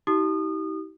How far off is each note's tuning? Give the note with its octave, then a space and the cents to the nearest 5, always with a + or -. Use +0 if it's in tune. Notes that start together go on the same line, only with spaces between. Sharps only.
D#4 +45 G4 -30 D#6 -30